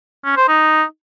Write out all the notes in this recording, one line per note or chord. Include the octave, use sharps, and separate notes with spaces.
C#4
C5
D#4